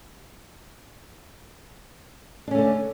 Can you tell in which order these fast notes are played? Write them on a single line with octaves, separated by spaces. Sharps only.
D4 C#4 A3 D3